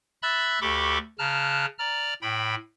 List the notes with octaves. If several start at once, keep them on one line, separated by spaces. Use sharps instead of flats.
E5 B5 E6 F#6 A6
D2 G4 A4 B5 C#6 D6
C#3 A5 A#5 F6 F#6
D5 A#5 F6
A2 G5 B5